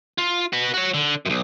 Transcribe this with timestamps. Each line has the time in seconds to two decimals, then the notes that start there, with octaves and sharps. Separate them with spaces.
0.18 F4
0.53 F#4 B4
0.74 F#4 C#5
0.94 D3
1.25 B1 F#2